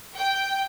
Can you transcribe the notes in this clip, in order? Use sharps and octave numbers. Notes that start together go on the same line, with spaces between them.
G5